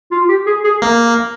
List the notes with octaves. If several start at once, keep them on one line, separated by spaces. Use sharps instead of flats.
F4
G4
G#4
G#4
A#3